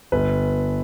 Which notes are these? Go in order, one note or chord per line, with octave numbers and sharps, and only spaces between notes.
G1 B4